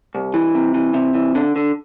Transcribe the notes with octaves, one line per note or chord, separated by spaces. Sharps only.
C2
E3
C3
E3
C3
E3
D3
D3